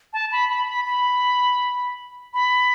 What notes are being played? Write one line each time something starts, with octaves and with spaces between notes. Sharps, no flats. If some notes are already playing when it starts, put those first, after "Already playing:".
A5
B5
B5
B5
B5
B5